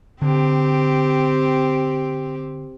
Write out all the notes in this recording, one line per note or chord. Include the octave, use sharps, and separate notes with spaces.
D3 C4 G4